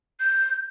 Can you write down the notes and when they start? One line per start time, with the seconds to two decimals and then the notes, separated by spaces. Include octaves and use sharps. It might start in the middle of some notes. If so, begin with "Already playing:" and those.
0.20 G6